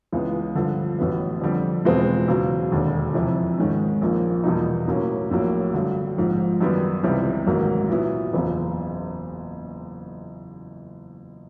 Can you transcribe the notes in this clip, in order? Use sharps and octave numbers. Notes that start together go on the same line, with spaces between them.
C#2 C#3 E3 G#3 B3
G2 D3 F3
A1 A2 F#3 B3
F2 D3 G3
E2 B2 G#3 C4 F4
E2 C#3 F#3
E1 D#2 D3
F2 C3 E3
G#2 D#3 G#3 C#4
A#1 A#2 F3 A#3
E2 B2 G3 A#3 D#4
A2 F#3 A#3 C#4
A#1 A2 F#3 A#3
G2 D3 F#3
A#1 G#2 F3
F#2 D#3 G3 B3
C#2 C3 E3 G3
A1 G#2 D#3 F#3 A#3
A#2 F#3 B3 E4
F#1 E2 C#3